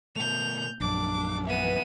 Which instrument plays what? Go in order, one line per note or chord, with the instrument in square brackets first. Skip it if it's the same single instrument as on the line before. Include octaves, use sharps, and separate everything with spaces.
[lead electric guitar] B2 A3 [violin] G6 F7
[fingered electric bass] A#1 F#2 [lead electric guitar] D4 [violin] D6
[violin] B3 D#7 [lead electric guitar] B4 E5